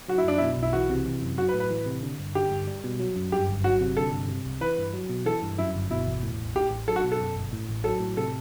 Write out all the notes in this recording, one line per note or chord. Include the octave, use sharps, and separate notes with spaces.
F#3 F#4
E4
F#2 D4
B2 E4
B1
E4
E3 F#4
C3
E3
F#2
F#3 F#4
B4
A2
B4
E3
C3
D3
G2
D3 G4
G2
G3
B2
F#3
F#2
G2 G4
G1
F#3 F#4
C3
D3 A4
G2
C3
C2
E3 B4
G2
F#3
B2
E3 A4
G2
F#2 E4
G1
B2 E4
E2
A2
A1
A2 G4
A1
F#3 A4
F#4
B2
A4
F#2
G1
A2
A1
F#3 A4
A2
C3 A4